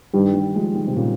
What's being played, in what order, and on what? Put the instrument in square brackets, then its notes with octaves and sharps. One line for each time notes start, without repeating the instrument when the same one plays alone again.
[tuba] G2 [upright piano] D#3 G3
[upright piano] D#3 G3
F3 G#3
D#3 G3
C3
A#2 C#3